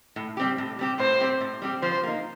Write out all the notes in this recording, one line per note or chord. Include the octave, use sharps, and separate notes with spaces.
A2
G3 C4 G4
A2
G3 C4 G4
A2 C5
G3 C4 G4
A2
G3 C4 G4
F3 C5
A#3 D#4